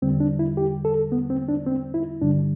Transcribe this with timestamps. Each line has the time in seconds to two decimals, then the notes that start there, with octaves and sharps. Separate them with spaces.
0.02 E2 D3 G3 C4
0.20 D4
0.39 E4
0.57 G4
0.85 A4
1.12 B3
1.30 C4
1.48 D4
1.66 C4
1.94 E4
2.22 G2 D3 G3 D4